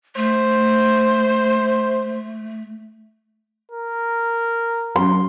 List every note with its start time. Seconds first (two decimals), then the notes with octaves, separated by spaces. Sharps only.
0.16 A3 C5
3.71 A#4
4.96 F#2 C6